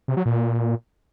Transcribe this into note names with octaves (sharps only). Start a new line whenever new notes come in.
C3
F#3
A#2